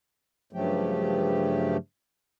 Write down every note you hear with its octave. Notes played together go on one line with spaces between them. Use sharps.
G2 C#3 F3 F#3 A3 G4